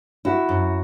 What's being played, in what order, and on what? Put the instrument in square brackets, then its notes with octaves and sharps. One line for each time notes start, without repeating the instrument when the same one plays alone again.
[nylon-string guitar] E4 [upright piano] F#4
[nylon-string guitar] F#2